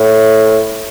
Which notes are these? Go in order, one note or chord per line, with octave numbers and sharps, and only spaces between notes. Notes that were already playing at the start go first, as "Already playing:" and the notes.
Already playing: A2